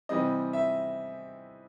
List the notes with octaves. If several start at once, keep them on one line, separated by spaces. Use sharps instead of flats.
C3 E3 G3 C4 D#5
E5